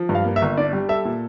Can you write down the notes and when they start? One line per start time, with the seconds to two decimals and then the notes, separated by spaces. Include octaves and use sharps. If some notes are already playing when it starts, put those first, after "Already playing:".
Already playing: F3
0.09 G2
0.15 F5
0.25 A#3
0.36 E5
0.42 G1
0.57 D4 D5
0.73 G3
0.89 A4 E5
1.05 A#2